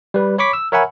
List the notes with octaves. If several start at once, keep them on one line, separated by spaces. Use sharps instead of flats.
G3 B4
C#5 B5 C#6 D6 B6
E6
A#4 C#5 E5 F#5 G#5 B5